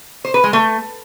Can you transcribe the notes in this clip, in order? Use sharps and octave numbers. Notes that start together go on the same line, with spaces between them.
C5
B4
G#3
A3